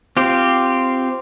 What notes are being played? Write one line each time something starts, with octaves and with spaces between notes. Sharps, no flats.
C4 F4 G4